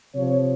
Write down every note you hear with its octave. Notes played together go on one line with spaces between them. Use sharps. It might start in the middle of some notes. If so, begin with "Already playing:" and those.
C3 F3 C#5